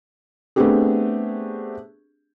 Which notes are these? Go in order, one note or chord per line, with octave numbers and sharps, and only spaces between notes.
A3 B3 C4 D4 G4 G#4